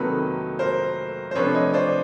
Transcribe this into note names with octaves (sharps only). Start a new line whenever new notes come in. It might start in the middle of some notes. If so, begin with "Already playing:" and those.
Already playing: F2 C3 D#3 F#3 A#3 A4 B4
A#4 C5
C5
C3 F3 A3 D4 B4 C#5
C#5 D#5
C5 D5